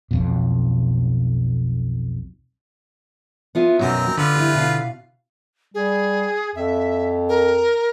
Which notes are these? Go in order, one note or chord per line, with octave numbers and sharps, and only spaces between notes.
B1 F2 B2
B3 F4 E5
F#2 B2 F#3 C4 D#4 A#4
D3 F4 B4
E4 G4
B2 F5
G3 G#4
F2 E5
A#4